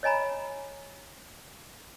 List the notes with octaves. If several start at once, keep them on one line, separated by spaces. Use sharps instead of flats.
C#5 D#5 G#5 A#5 B5